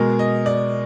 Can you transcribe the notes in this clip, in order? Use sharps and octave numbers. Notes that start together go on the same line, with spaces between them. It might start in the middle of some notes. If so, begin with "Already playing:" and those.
Already playing: B2 G#3 A#4
D#5
D5